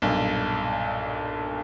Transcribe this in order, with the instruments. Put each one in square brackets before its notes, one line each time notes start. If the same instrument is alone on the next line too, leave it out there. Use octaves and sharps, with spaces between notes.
[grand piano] B1 G2 A#2